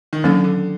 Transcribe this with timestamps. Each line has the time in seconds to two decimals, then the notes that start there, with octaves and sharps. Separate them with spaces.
0.13 D#3
0.24 D3 F#3 A#3 C#4
0.44 D3